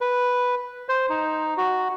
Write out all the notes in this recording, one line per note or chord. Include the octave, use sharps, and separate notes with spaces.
B4
C5
D#4
F#4